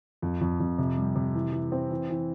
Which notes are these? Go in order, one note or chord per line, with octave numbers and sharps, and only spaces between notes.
F2
F2
F2
C3
G3
C3
E3
E3
C4
E3
E3